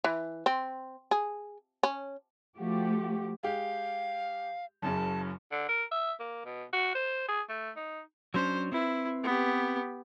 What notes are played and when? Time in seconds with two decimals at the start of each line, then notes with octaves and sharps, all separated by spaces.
0.04 E3
0.46 C4
1.11 G#4
1.83 C#4
2.58 F3 A3 F#4 G4
3.43 G#3 G4 F5
4.82 F#1 F#2 C#3 A5
5.51 D3
5.68 A#4
5.91 E5
6.20 A#3
6.45 B2
6.73 F#4
6.95 C5
7.28 G#4
7.49 A3
7.76 D#4
8.34 F#3 C#4 D4 C5
8.72 C4 E4 B4
9.24 B3 G4